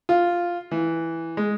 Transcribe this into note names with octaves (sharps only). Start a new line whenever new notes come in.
F4
E3
G#3